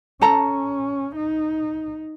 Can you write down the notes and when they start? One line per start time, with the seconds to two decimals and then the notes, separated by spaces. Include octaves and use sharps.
0.21 C#4 A4 A5 A#5
1.16 D#4